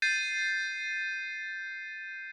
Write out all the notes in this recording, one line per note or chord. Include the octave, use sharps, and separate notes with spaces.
G6 A6 C7 D#7